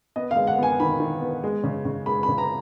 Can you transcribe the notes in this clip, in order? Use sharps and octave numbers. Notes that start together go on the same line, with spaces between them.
B3 D#5
F5
G#3
F#5
B3 G#5
D#3 B5
D#3
B3
G#3
C#3
C#3
G#3 B5
B5
C#3
A#5